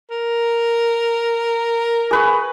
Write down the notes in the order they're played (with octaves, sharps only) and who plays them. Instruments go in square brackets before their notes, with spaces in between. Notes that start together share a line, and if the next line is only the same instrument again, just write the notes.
[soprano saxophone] A#4
[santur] G#4 B4 C#6